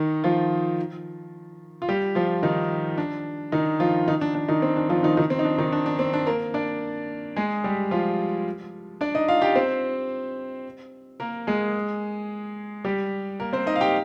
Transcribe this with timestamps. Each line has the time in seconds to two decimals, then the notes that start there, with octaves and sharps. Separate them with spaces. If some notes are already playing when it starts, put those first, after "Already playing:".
Already playing: D#3 D#4
0.24 F3 F4
1.82 F4
1.89 G3 G4
2.15 F3 F4
2.43 D#3 D#4
2.98 D4
3.52 D#3 D#4
3.80 F3 F4
4.08 D#3 D#4
4.21 D4
4.35 D4
4.48 D#3 D#4
4.62 C4
4.77 D4
4.89 F3 F4
5.03 D#3 D#4
5.17 D#3 D#4
5.30 C4
5.39 D#4
5.45 D4
5.58 D#3 D#4
5.72 D4
5.86 D4
5.99 C4
6.13 D4
6.27 A#3 A#4
6.54 D4 D5
7.36 G#3 G#4
7.64 G3 G4
7.91 F3 F4
9.01 D4 D5
9.15 D#4 D#5
9.28 F4 F5
9.42 G4 G5
9.55 C4 C5
11.20 A#3 A#4
11.47 G#3 G#4
12.85 G3 G4
13.40 A#3 A#4
13.53 C4 C5
13.66 D#4 D#5
13.76 F5
13.81 G4 G5